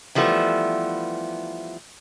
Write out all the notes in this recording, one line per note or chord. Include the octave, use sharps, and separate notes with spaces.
E3 F3 G3 A3 B3